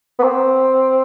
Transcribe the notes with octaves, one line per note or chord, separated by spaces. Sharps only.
B3
C4